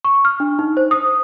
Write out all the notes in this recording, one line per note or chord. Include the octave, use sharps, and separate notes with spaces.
C#6
F6
D4
D#4
C5
D#6